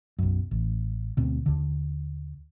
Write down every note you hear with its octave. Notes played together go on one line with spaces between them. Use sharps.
B1 F#2
A1
D2 B2 C4
D#2 D3